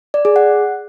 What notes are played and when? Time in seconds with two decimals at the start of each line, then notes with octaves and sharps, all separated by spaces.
0.14 D5
0.25 G#4
0.36 F#5